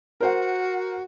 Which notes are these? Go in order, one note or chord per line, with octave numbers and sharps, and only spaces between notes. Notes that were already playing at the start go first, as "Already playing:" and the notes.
F#4 A#4 C5 F#5